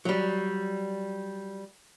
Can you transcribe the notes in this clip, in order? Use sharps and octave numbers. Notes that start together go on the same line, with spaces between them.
F#3 G3